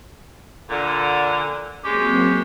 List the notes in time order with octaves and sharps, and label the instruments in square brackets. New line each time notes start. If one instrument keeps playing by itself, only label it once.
[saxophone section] A#2 D3
[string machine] F#3 A#3 C4 [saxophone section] G#3 C#4 G4